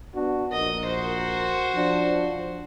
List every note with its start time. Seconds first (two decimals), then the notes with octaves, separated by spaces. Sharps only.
0.14 B3 D4 F#4
0.52 A#1 A#4 D#5
0.85 F#4 C5
1.75 F3 D4